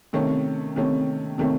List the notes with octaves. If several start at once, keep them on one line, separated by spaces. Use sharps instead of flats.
C3 D#3 A3 C#4
C3 D#3 A3 C#4
C3 D#3 A3 C#4